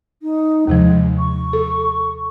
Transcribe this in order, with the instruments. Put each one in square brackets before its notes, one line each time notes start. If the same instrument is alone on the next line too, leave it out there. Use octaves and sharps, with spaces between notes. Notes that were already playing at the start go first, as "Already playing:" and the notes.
[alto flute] D#4
[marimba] D#2 C3 F3 [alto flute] G#3
[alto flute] C#6
[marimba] A4